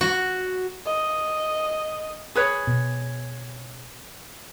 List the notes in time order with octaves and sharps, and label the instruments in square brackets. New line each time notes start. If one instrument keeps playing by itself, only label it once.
[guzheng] F#4
[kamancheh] D#5
[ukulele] G#4 B4 C#5
[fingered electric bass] B2